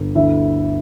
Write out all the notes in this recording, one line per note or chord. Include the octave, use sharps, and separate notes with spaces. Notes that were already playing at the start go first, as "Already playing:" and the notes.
Already playing: G1
D2 E4 E5